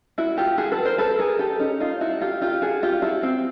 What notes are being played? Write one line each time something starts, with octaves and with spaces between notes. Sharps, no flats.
E4 F#4
F4 G4
F#4 G#4
A4 B4
A#4 C5
A4 B4
G#4 A#4
G4 A4
C#4 D#4
D#4 F4
E4 F#4
F4 G4
F4 G4
F#4 G#4
F4 G4
E4 F#4
C4